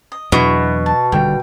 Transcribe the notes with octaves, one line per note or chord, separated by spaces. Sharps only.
D#5
E2 B2 F#3 D4 E4 C#6 D#6
A5
D#1 D3 G3 G5